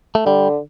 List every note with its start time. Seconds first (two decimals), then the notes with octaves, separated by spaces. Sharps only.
0.15 A3
0.26 D3 G3